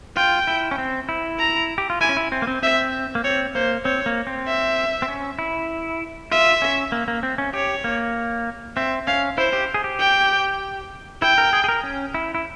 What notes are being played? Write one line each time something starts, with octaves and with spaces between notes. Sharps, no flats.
F4 G5
E4
C#4
C4
E4
A#5
G4
F4
E4 G#5
C#4
E4
C4
A#3
C4
C4 E5
A#3
C4 C#5
A#3 C5
C4 C#5
A#3
C4
E5
C4
C#4
E4
F4 E5
C#4
A#3
A#3
C4
C#4
G4 C#5
A#3
C4 E5
C#4 F5
E4 C5
G4
G#4
G4
G5
E4 G5
A#4
G#4
G#4
A#4
C#4
E4
E4